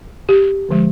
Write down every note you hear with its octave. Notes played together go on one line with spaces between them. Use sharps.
G4
D3 F3 G#3